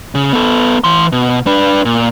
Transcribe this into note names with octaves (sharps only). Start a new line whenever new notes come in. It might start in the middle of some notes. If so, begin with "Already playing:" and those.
C#3
B3 A4
E3 C6
B2
D4 B4
A#2